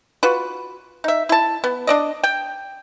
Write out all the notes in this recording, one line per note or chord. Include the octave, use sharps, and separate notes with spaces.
F4 F#4 B4
D#4 E5
E4 A5
B3
D4 D5 D#5
G5